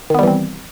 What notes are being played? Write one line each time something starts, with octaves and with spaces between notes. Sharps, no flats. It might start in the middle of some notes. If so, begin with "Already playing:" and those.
D#3 E3 G3 B3 C4